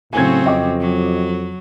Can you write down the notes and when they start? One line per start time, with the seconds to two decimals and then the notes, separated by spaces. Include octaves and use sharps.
0.13 A2 C#3 F#3 C4 G#5 G#6
0.46 F2 D#5 G5 D6
0.80 F#3